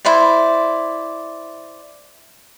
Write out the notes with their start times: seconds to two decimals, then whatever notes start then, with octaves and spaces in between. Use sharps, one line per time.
0.05 E4 C5 D5